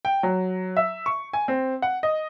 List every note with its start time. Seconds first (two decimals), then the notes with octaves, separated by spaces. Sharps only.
0.05 G5
0.23 F#3
0.77 E5
1.06 C#6
1.33 G#5
1.48 C4
1.82 F#5
2.03 D#5